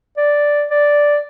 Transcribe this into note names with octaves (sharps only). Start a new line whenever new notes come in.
D5
D5